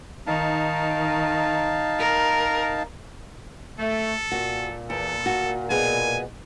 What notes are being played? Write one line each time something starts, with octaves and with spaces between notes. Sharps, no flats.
D#3 D#4 F5 A5
A#4
A3 A4
A#2 F#4
E2 A4
F#4
B2 B3 G#4 G#5